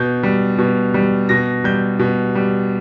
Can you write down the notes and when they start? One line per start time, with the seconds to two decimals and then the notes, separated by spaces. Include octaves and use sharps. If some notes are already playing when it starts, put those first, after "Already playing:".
Already playing: B2 G6
0.23 G3
0.58 B2
0.94 G3
1.29 B2 A#6
1.64 G3 G6
1.99 B2
2.35 G3